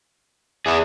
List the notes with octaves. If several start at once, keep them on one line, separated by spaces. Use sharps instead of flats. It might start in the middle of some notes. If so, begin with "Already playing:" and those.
E2 E4 G#4